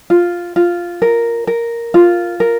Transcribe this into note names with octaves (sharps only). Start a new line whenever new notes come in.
F4
F4
A#4
A#4
F4
A#4